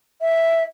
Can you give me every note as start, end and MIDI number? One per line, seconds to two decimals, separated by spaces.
0.22 0.64 76